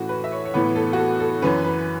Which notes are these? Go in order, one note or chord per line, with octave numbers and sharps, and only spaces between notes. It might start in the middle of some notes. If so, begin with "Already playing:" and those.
Already playing: A2 E3 A3 C#4 F#4
B4
E5
C#5
C#5
A2 E3 B3 B4
A4
F#4
A4
A4
F#2 E3 C#4 B4
B4